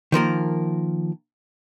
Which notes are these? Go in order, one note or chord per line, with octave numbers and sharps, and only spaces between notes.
D#3 F3 A#3 A#4